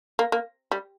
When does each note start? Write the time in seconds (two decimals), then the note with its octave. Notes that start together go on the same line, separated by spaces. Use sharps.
0.19 A#3
0.32 A#3
0.71 G3